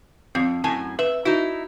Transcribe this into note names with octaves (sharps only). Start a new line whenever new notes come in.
F2 C4
F#2 A2 G#5 A5
B4 E5
D#4 E4 F#4